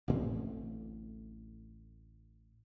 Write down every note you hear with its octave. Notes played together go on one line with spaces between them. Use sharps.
A1 D2 A2 C4